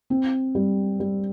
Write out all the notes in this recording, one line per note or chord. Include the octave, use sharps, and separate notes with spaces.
C4
G3
G3